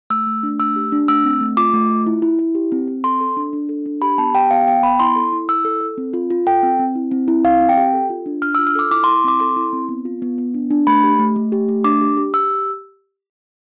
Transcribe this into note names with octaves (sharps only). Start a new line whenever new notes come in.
A3 E6
A3
D4
A3 E6
G4
D4
A3 E6
C4
A3
F4 D6
A3
F4
E4
E4
E4
G4
C4
C4
A4 C6
A4
D4
D4
A4
D4
G4 B5
B3 A5
G4 G5
B3 F5
B3 G5
B3 B5
E4 C6
A4
E4
E4 E6
A4
A4
C4
F4
F4
A4 G5
C4
C4
E4
C4
E4
C4 F5
C4
G5
G4
A4
F4
D4
D4 F6
E6
F4
F6
A4 D6
E4 D6
C6
E4
C4 D6
A4 C6
E4
C4
B3
F4
B3
B3
D4
D4
A3 B5
G4
A3
A3
G4
A3
D4 D6
G4
G4
G4 E6